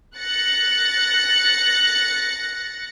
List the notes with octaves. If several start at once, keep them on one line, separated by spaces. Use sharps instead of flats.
F#6 A6 A#6 C#7